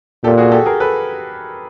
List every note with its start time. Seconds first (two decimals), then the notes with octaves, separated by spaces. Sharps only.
0.24 A#2 G4 A4
0.38 F#4 G#4
0.52 G4 A4
0.66 G#4 A#4
0.80 A4 B4